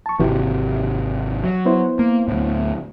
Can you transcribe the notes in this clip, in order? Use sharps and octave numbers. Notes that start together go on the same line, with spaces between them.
A5 C#6
G#1 C3 E3 F#4 G4
F#3
B3 E4 C5
A#3
D2 A2